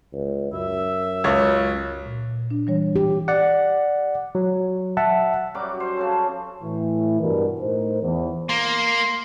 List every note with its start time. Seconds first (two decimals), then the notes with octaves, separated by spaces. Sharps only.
0.13 C#2
0.53 F#2 E5
1.24 C#2 C#5
2.06 A#2
2.51 D4
2.67 E3 G3 C#5
2.96 G4
3.28 D5 F#5
4.35 F#3
4.97 E5 F#5 A5
5.54 F#2 F#3 G3 D6
5.80 C5
5.97 C#3 C#4 A4
6.62 A2 E3
7.21 G2 B2 G3 A#4
7.61 A2 D#4 A#4 C5
8.02 E2
8.49 A#3 C6